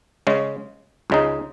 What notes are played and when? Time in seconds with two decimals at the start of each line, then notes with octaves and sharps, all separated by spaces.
0.27 C#3 G#3 C#4
1.10 C#2 C#3 G#3 D#4